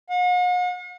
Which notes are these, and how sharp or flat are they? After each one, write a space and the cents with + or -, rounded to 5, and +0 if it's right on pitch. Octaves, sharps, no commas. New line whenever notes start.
F#5 -45